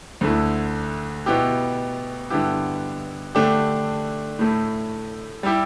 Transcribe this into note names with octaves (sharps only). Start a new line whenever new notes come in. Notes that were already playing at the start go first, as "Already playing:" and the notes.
D2 D3 A3 E4
B2 B3 E4 G4
G2 D3 B3 E4 G4
D3 A3 D4 G4
A2 A3 E4
G3 E4 G4